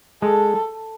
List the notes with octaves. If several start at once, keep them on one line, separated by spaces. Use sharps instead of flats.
G#3 A4